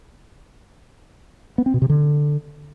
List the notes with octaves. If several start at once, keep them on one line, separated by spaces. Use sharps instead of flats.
B3
C4
B2
C3
D3